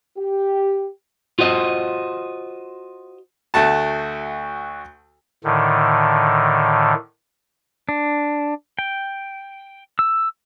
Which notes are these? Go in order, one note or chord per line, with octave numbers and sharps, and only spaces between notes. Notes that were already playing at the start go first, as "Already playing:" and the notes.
G4
F4 F#4 C5 D#5
D2 A3 F#4 A5
A2 D3 D#3
D4
G5
E6